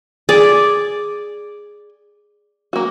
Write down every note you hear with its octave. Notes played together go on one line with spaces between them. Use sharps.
G#4 D5
A#3 F#4